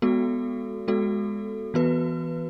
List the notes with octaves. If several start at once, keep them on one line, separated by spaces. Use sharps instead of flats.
G#3 B3 F#4 A4
G#3 B3 F#4 A4
E3 B3 F#4 B4